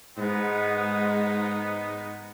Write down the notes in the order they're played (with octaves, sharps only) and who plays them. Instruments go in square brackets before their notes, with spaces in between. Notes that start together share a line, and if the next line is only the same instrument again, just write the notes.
[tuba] G#2 [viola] G#3 D#4 [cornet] B3